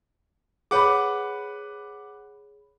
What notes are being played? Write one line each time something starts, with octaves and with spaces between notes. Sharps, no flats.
G#4 B4 C#5 F#5 B5 D6